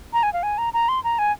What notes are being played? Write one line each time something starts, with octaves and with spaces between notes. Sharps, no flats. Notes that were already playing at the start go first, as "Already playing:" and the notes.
A#5
G#5
F5
G#5
A#5
A#5
C6
A#5
G#5